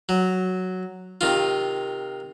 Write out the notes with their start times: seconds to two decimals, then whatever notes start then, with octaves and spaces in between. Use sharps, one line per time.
0.09 F#3
1.21 C3 D#3 F4